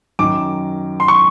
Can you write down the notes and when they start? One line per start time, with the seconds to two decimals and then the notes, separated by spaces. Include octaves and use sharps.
0.19 F#2 D#3 F#3 D6
1.00 C6
1.08 C#6